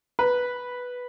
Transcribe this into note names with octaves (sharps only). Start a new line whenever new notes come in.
B4